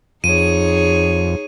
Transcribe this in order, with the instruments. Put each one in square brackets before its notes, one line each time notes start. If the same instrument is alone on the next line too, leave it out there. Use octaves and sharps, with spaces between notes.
[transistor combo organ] F2 [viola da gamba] D#4 G#4 C#5 [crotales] D#7